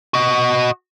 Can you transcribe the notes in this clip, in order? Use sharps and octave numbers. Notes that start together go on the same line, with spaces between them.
F#4 D#5